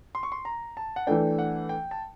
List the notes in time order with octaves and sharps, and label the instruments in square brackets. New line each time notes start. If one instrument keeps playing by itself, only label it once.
[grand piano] C6
C#6
C6
A#5
A5
F#5
[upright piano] E3 A3 D4 [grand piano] G5
[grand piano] F#5
G5
A5